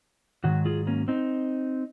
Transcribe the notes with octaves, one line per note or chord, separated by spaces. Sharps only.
G#2 D#3 F#3 F#4
F4 G#4
A#3 C#4
C4 D#4